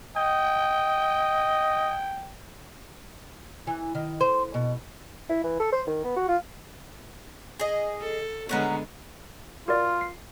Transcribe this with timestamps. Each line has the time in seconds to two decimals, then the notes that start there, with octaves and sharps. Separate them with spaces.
0.16 D#5 G5
3.67 E3
3.95 D#3
4.21 C5
4.54 B2
5.29 E4
5.44 E3
5.60 A4
5.72 C5
5.87 D#3
6.04 B3
6.16 F#4
6.28 F4
7.59 G#4 D#5
8.01 A4
8.49 D3 G#3 B3 C#4 F#5 A#5
9.68 F4 F#4 A#4 D5
10.01 C7